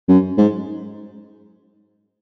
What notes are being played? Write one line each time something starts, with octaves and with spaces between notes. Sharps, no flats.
F#2
G#2